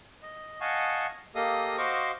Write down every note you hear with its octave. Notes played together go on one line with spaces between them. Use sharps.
D#5
D#5 F5 F#5 G#5 A5 C#6
A#3 G4 A4 D#5 F5 D#6
F#4 C5 D#5 F5 C#6 D6